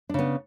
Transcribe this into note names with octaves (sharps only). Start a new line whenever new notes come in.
C#3 B3 D4